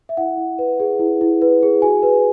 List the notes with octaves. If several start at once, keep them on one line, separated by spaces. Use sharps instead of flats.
E5
E4 F#5
E4
B4
G#4
E4
E4
B4
G#4
F#4 G#5
B4